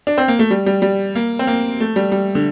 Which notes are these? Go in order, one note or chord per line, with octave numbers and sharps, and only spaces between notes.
D4
C4
A#3
A3
G3
G3
G3
A#3
C4
A#3
A3
G3
G3
D3